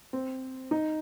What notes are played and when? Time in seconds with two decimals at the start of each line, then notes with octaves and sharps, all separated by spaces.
0.13 C4
0.71 D#4